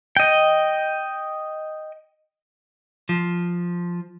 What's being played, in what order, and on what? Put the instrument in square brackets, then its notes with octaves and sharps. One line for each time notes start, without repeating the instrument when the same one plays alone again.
[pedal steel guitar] D#5 G5
[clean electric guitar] F3